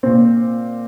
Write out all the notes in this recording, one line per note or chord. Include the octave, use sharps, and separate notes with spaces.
A#2 C4